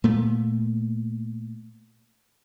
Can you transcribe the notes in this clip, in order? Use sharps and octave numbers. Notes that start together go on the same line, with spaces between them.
A#2 A3 B3